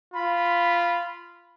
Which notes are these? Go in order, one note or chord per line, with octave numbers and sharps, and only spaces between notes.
F4 B5